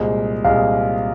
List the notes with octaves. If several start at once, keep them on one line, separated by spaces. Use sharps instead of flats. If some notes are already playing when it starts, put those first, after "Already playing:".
Already playing: C2 A#2 G#3
C2 A#2 G#3 F5